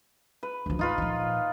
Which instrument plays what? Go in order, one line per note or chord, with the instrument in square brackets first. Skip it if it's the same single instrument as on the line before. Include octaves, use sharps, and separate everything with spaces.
[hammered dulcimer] B4
[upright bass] D2 F3
[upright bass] G#2 [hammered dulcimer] D#4 F4 B4
[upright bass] A#2 F3